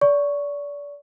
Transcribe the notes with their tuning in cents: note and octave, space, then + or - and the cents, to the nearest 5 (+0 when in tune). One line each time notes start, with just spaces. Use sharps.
D5 -30 C#6 +0